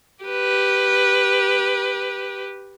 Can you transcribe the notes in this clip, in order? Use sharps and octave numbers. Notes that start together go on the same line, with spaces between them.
G4 B4